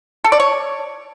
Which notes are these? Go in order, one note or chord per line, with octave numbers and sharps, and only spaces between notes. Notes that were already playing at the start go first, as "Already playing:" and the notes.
A4
D5
C#5